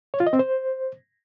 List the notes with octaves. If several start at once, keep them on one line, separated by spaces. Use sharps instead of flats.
C#5
F4
D#5
C4
C5